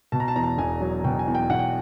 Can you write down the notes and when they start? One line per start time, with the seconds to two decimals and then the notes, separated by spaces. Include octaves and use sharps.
0.12 B2 A5
0.20 A#5
0.28 A5
0.35 E2 A#5
0.44 A5
0.58 E1 G#5
0.81 F#3
1.04 B2 G5
1.19 G#5
1.27 E2
1.35 G5
1.50 E1 F#5
1.59 G5